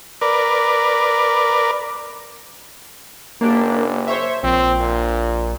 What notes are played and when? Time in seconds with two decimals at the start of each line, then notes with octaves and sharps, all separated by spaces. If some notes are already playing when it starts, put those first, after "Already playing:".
0.21 A#4 B4 D5
3.41 F#1 A#3 D4 G4
4.08 C5 C#5 E5
4.43 A#1 C4
4.80 A#2